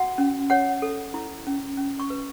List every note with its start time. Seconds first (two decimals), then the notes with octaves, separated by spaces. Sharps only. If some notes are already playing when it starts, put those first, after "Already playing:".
Already playing: F#4 F#5
0.18 C#4
0.50 C#5 F#5
0.82 A4
1.14 E4
1.47 C#4
1.77 C#4
2.00 C#6
2.10 B4